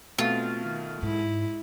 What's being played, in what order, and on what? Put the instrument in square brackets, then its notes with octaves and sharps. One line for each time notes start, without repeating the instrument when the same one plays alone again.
[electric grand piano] B2 A3 [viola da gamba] C4 [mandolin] F4
[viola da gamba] D#3
[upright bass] G#2 [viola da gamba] G#3 E4